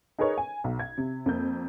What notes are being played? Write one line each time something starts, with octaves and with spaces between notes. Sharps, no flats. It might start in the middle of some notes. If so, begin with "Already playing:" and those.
D#4 G#4 A#4 B4 C#5
G#5
B1
G#6
C3
F2 A#3 G6